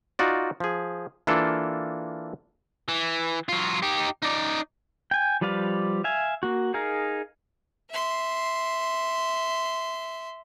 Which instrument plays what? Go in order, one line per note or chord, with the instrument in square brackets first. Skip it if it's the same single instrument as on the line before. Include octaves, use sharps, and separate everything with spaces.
[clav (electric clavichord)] D#4 F4 F#4 D5
F3 G#4
E3 A#3 D4 F4 A4
[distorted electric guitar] E3
F#3 F4
D#4 G4
D#4 D5
[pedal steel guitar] G5 G#5
F3 G3 B4 D5 F5
E5 F5 G#5
A#3 F#4
D#4 G#4 A#4 F5
[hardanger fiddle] E5 C6